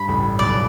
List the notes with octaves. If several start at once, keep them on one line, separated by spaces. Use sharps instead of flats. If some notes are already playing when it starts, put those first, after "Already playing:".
Already playing: G2 B5
A1 A2
B1 B2 D5